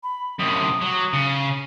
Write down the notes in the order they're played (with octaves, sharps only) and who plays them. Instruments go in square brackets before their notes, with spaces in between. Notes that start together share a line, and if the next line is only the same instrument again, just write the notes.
[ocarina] B5
[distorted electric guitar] F#2 C3 [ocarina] D#6
[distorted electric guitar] F#3
C#3